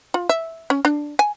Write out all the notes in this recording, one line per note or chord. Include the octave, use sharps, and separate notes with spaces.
F4
E5
C#4
D4
G#5